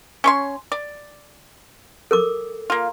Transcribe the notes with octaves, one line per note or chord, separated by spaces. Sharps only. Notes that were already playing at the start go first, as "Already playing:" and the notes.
C#4 C#5 C6
D5
A4 A#4 D6
A#3 F4